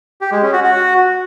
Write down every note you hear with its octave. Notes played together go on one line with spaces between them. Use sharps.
G4
G#3
C#4
F#4
F#4